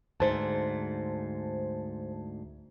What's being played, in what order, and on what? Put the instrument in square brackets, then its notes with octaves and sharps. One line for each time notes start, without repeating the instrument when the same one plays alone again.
[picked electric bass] D2 G#2 [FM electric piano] C5 A5